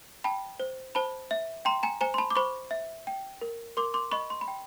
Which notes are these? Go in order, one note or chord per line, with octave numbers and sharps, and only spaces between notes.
G5 A5 B5
C5
C5 A5 B5
E5
G5 A#5 C6
G#5 A#5
C5 G#5 A#5
C6
A5 B5
D6
C5 B5 C#6
E5
G5
A#4
A#4 C6 D6
C6 D6
D#5 B5 C#6
C6
B5
G5